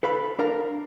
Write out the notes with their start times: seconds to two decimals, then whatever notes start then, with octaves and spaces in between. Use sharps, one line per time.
0.03 A4 B4 F5 B5
0.39 D4 A#4 F5 A#5